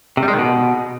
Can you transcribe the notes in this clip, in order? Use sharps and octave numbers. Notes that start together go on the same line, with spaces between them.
C3
G3
G#3
D#3
B2